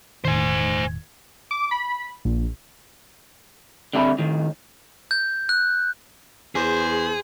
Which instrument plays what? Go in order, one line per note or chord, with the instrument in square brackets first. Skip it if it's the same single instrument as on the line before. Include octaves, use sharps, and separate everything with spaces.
[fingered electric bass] E1 A2 D#3 [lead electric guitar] C5 G#5
[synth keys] D6
B5
A#1
[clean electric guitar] D3 G3 C4 E5 A5 B5
A2 D#3
[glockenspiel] G6
F#6
[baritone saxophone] E2 [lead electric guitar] G#4 [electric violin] C5